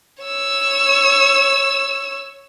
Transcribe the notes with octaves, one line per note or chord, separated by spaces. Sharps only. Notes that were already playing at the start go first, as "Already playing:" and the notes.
C#5 E6